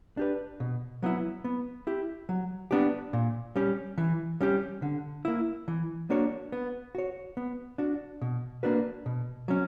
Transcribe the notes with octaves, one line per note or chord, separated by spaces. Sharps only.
D4 G4 B4
B2
F#3 B3 E4
B3
E4 G4
F#3
B3 D4 G4
A#2
G3 C#4 G4
E3
G3 C#4 G4
D3
A#3 E4
E3
A#3 D4 F#4 C#5
B3
F#4 C#5
B3
D4 F#4
B2
A#3 D4 F#4 B4
B2
F#3 C#4